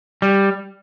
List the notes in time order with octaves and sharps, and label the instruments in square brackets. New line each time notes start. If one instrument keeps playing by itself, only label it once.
[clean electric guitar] G3